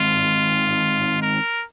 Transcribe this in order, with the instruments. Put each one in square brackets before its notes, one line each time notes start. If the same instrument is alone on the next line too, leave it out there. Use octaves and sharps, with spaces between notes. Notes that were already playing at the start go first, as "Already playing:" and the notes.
Already playing: [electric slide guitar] D#3 G#3 C4 D#4 [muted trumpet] F4
[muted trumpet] A#4